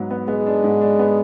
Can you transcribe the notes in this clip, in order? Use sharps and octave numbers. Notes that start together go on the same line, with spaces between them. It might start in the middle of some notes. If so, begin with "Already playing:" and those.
Already playing: G#2 F#3 B3
B3
G#3 B3
D4
G#2
D4
B3